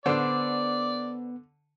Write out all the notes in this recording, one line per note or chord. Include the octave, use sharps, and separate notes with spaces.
D3 B3 D4 C5 D5